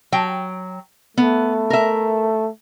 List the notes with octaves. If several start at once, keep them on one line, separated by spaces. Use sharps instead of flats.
F#3 G5
A3 B3
A#4 E5